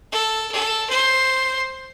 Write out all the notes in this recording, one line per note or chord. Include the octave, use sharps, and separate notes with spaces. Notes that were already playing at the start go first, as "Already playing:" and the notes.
A4
A4
C5